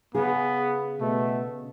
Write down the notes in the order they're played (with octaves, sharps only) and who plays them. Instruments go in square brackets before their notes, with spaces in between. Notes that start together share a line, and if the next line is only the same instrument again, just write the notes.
[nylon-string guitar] C#3 G#4 [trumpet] B3
[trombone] B2 [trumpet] A3